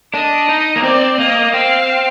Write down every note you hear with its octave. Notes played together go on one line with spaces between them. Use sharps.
D4 D#5
D#4
A#3
C4 D5
A#3 D#5
C4 F5